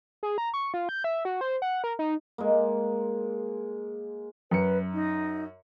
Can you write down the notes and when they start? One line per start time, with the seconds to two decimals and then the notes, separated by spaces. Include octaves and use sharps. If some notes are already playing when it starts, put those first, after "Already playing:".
0.23 G#4
0.38 A#5
0.54 C#6
0.74 F4
0.89 G6
1.04 E5
1.25 F#4
1.41 C5
1.62 F#5
1.84 A#4
1.99 D#4
2.38 G#3 A#3
4.51 F#2 B4 C#7
4.93 D#4